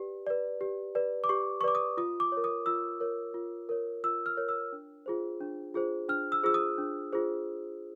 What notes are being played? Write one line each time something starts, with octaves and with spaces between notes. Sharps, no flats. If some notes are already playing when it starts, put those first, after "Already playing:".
Already playing: G4 B4 D5
B4 D5
G4
B4 D5
D6
G4 C#6
C#6
B4 D5 D6
D#6
F4 D#6
D6
A#4 C#5
D#6
F4 E6
A#4 C#5
F4
A#4 C#5
F4 E6
F6
A#4 C#5
E6
D4
F4 G#4 C5
D4
F4 G#4 C5
D4 F6
E6
F4 G#4 C5 E6
D#6
D4
F4 G#4 C5